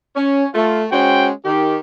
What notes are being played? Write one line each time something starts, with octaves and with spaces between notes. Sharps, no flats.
C#4
A3 F4
G#3 C#4 F#4 C5 G5
D#3 G4